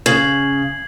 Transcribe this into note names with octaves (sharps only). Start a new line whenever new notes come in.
C#3 G#6 C7 F#7